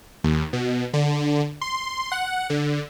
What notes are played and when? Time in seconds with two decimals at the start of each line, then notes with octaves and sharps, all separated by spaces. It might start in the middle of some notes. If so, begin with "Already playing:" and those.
0.24 D#2
0.53 B2
0.94 D3
1.61 C6
2.12 F#5
2.50 D3